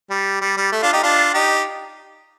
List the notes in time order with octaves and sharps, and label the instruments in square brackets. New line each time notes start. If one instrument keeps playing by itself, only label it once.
[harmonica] G3
G3
G3
A3
D4 F4
D#4 G4
D4 F4
D#4 G4